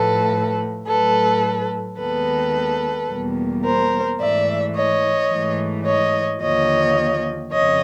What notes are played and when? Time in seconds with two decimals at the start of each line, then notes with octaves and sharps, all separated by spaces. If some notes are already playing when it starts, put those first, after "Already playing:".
Already playing: A2 F3 A3 A4 B4
0.87 A2 F#3 A3 A4 B4
1.98 D#2 D#3 G#3 B3 A4 B4
3.09 E2 B2 G3 A#3
3.64 A#4 C5
4.20 G#2 E3 A3 D5 E5
4.75 C#5 D#5
5.30 G#2 E3 A3
5.85 C#5 D#5
6.41 D#2 D3 F3 C#5 D#5
7.52 F2 C#3 C#5 D#5